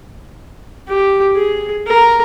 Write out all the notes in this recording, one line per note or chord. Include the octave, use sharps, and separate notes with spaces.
G4
G#4
A#4